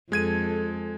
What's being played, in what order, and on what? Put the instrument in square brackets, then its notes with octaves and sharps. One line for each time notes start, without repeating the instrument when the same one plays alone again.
[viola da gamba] F2 A4 [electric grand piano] G#3 G#6 D#7